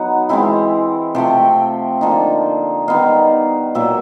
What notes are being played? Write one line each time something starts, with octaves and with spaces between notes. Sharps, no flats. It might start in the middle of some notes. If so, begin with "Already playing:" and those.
Already playing: F#3 B3 D#4 F#5
E3 G#3 C4 E4
C3 F3 A3 G5
D3 F3 A#3 D#4
D#3 G3 B3 D#4 F5
A#2 F#3 A#3 E5